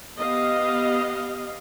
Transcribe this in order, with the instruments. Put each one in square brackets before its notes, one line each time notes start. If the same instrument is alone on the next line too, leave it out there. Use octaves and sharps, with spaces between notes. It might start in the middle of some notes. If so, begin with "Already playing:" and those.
[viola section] B3 G4 D#5 F5